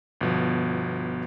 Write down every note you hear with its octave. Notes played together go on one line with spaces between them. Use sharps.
G1 B2 F3